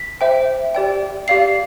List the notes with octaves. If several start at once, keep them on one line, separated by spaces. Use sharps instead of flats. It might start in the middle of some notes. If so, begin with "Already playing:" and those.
Already playing: B6
C5 E5 G5
G4 D5 G5
G4 D5 F5 C7